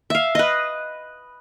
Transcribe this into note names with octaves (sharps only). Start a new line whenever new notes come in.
E5 F5
B4 D#5